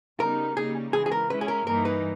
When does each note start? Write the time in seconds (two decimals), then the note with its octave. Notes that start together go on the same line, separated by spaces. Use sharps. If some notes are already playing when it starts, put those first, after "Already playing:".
0.20 C#3 G3 B3 D#4 A#4
0.57 C#3 G3 A#3 D#4 G#4
0.93 C#3 E3 G#3 G#4
1.06 G#4
1.12 A#4
1.30 C#3 G#3 C#4 E4 B4
1.41 G#4
1.48 A#4
1.67 G2 E3 A#3 D#4 A#4
1.85 B4